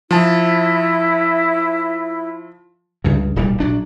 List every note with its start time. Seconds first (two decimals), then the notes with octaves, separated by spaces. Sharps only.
0.11 F3 E4 A5
3.04 C#2 G2 C#3
3.36 D1 B1 A#2 G3
3.60 A#1 F#3 D4